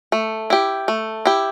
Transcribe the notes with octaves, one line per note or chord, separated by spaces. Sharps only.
A3
E4 G4
A3
E4 G4